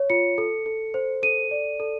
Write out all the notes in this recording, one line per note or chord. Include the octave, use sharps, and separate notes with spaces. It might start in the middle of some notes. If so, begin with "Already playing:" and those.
Already playing: C#5
F4 C#7
A4
A4
C5
A4 D#7
D5
A4